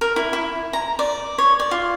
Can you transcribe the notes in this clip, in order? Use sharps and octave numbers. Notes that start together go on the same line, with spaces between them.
A#4
E4
E4
A#5
D5
C#5
D5
F4